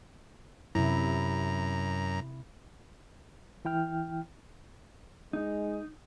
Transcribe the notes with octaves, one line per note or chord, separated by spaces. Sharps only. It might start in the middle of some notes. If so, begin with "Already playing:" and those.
F#2 C3 E4 A#5
E3 E4 G5 F6
G#3 D#4